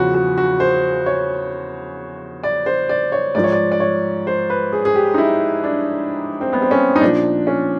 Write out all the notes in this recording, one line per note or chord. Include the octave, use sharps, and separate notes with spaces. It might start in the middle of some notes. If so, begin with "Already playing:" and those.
Already playing: E2 C#3 F3 F#4
F#4
F#4
C5
C#5
D5
C5
D5
C#5
G#2 F3 D5
C#5
D5
D5
C#5
C5
B4
G#4
G#4
G4
D#4
E4
D4
C4
B3
C4
C#4
D#4
A#2 F3 D4
C#4